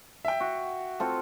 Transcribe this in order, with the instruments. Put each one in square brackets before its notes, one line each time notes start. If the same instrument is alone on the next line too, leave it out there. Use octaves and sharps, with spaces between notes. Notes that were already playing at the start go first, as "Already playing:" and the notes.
[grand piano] E5 G5
[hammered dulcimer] F#4
C4 F4 A4